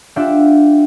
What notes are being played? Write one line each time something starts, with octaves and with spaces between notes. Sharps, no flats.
D4 F4 G4 E5 F#5 G5